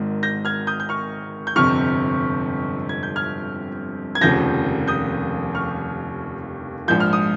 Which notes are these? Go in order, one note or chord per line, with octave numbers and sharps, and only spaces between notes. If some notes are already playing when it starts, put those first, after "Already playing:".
Already playing: G#1 G#2 D#3
G6 A#6
F6 G#6
D#6 G6
G6
C#6 F6
G6
G1 F2 C3 C#6 F6
G#6
G6
F6 G#6
G#6
F1 D#2 C#3 F3 G6 A#6
D#6 G6
C#6 F6
A#1 G#2 F3 G6
F6
D#6